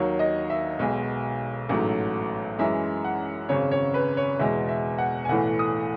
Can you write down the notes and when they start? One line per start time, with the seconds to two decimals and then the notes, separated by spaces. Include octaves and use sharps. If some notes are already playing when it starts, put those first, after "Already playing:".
Already playing: D#2 D#3 F#3 C#5
0.19 D#5
0.50 E5
0.79 B1 B2 G#3
1.69 A1 G#2 F#3 A3
2.59 F#2 E3 G#3 E5
3.04 F#5
3.49 G#1 F#2 C#3 C#5
3.71 C#5
3.94 B4
4.17 C#5
4.39 E2 B2 G#3 E5
4.68 E5
4.98 F#5
5.25 G#5
5.29 B1 A2 E3 A3 F#5
5.59 D#6